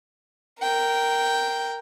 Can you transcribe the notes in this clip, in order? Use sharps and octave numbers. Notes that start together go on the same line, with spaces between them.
A#4 G5